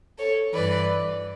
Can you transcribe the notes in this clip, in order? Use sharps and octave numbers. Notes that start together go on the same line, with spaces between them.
A4 C#5
G2 E3 B4 D5